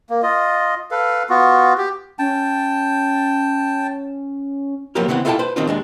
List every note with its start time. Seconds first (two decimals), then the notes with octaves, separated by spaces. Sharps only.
0.10 A#3
0.23 F4 D#5
0.91 A4 B4 F5
1.29 B3 F4 F#4
1.78 G4
2.19 C#4 G5 A5
4.95 F3 F#3 A#3 B3 G4 A#4
5.08 C#3 E3 B3 C4 F#5
5.25 E4 F4 A4 F5 G5 A5
5.39 B4 C5
5.56 B2 D#3 C4 D4 F4
5.67 D#2 G#3 D4